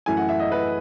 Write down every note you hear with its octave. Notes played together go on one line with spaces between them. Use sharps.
F#2 E3 A3 E4 G#5
F#5
E5
D#5
B4